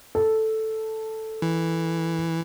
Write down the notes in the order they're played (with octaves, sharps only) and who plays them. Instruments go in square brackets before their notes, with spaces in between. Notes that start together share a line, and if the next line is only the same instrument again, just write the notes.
[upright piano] A4
[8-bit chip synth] E3